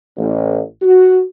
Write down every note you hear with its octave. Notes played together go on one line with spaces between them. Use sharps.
A1
F#4